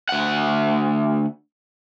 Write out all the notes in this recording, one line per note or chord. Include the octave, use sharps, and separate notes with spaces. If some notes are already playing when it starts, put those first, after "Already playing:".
D2 F#5